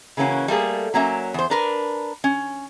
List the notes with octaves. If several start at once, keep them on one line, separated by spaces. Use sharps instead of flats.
C#3 E3 A#3 C#4 F#4
G3 A3 A#3 G#4
F#3 A#3 C#4 E5
E2 C5
D4 A#4 B4
C#4